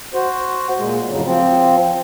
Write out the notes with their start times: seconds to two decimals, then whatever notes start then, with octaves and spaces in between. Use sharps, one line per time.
0.14 F#4 C5
0.79 A#2 G#3
1.09 F2 A2 C#3 F#3
1.25 F3 C4